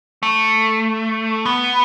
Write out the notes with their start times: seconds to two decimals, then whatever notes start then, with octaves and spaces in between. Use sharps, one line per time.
0.23 A3
1.45 B3